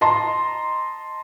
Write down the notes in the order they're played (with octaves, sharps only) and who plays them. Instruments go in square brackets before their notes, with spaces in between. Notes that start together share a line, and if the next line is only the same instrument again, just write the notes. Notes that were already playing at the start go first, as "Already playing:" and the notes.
[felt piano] D#5 A5 A#5 C6